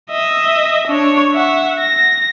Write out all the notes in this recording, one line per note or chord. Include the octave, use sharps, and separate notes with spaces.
D#5 E5
D4 C#5
E5 F#5
A#6